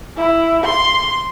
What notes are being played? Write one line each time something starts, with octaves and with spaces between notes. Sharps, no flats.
E4
C6